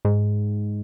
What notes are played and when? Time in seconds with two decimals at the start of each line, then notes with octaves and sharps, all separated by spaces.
0.05 G#2